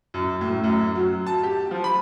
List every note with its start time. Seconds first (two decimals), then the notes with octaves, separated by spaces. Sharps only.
0.14 F#2
0.41 A2
0.64 F#2
0.95 F#3
1.27 A5
1.43 G4
1.71 F3
1.84 B5